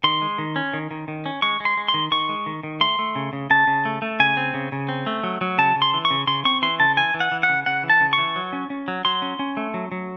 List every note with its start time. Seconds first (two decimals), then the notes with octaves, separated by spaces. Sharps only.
0.04 D#3 C6
0.22 G#3
0.38 D#3
0.56 C#4
0.73 D#3
0.91 D#3
1.08 D#3
1.26 C#4
1.42 G#3 C#6
1.60 G#3
1.65 C6
1.77 G#3
1.88 C6
1.94 D#3
2.12 D#3 C#6
2.29 G#3
2.46 D#3
2.63 D#3
2.81 A3 C6
2.99 A3
3.16 C#3
3.33 C#3
3.50 C#3 A5
3.67 C#3
3.85 A3
4.02 A3
4.20 C#3 G#5
4.37 C4
4.54 C#3
4.72 C#3
4.89 C4
5.06 A3
5.24 F#3
5.41 F#3
5.58 C#3 A5
5.76 C#3
5.82 C6
5.94 E3
6.05 C#6
6.11 C#3
6.27 C#3 C6
6.45 C4 C#6
6.62 E3 C6
6.80 C#3 A5
6.97 E3 G#5
7.14 E3
7.20 F#5
7.32 E3
7.43 F#5
7.49 C#3
7.66 C#3 F#5
7.83 E3
7.90 A5
8.01 C#3
8.13 C#6
8.18 E3
8.36 F#3
8.53 C#4
8.70 C#4
8.88 F#3
9.05 F#3 C6
9.22 C#4
9.39 C#4
9.57 A3
9.74 F#3
9.92 F#3